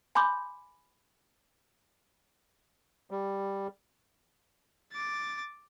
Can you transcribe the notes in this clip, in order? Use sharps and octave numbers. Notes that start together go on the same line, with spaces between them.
G#5 B5 C6 D6 G6
G3
D6 A6